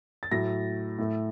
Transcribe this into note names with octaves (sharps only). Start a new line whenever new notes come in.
A6
A2 F#3 A3 A#6
A2 A3